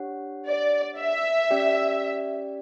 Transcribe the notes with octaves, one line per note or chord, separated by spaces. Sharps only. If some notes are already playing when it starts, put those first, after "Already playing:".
Already playing: D4 G4 C#5 F#5
D5
E5
C#4 G4 D5 G5